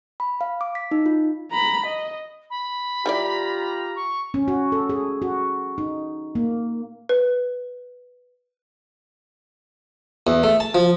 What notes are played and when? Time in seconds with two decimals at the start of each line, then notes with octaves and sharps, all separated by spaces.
0.20 B5
0.41 F5
0.61 D6
0.75 B6
0.91 D#4
1.06 F4
1.51 A#5 B5
1.86 D#5
2.50 B5
3.06 G3 E4 F4 G4 D5 A#5
3.96 C#6
4.34 C#4
4.48 F#4
4.72 A4
4.90 G#4
5.22 F#4
5.78 D#4
6.35 A#3
7.09 B4
10.27 E2
10.43 A3
10.60 A5
10.75 F3